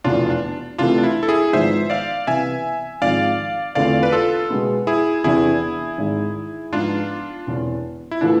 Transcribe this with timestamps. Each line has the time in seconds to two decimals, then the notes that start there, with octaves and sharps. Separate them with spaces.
0.04 F1 E2 B2 D4 F4
0.30 D4
0.78 C2 C3 E3 A3 D4 F4
0.98 D4
1.03 E4
1.23 A4
1.28 E4 G#4
1.53 G#1 G#2 F3 G#3 B3 C5 E5
1.90 D5 F5
2.27 C2 C3 E3 B3 E5 G#5
3.02 G#1 G#2 F3 G#3 C4 D5 F5
3.75 E2 D3 A3 C4 F4 D5 F5
4.03 B4
4.12 F4 A4
4.50 B2 G#3 B3
4.87 E4 G#4
5.24 E2 C3 E3 B3 D4 E4 G#4
5.98 G#1 G#2 G#3
6.73 G#2 F3 B3 D4 F4
7.47 E1 E2 C3
8.11 E4
8.21 A2 E3 B3 D4 F4 A4